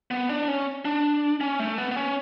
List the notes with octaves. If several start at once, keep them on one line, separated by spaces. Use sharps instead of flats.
B3
D4
C#4
D4
C#4
A3
B3
B3
C#4